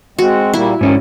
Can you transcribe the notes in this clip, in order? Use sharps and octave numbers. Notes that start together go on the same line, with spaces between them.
G#3 C4 F#4
A#2 G3 A#3 E4
G#2 D#3 C#4